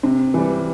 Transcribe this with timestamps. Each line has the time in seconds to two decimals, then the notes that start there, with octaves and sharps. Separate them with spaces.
0.03 C3
0.34 E3 G3